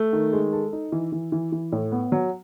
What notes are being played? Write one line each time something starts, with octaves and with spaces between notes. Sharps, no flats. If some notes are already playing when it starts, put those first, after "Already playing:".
Already playing: A3
D#3
G#3
A4
D#4
E3
E3
E3
E3
A2
B3
F#3